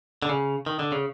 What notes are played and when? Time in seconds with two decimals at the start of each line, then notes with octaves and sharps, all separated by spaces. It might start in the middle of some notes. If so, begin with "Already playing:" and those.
0.22 D3
0.29 C#3
0.66 D#3
0.79 D3
0.92 C#3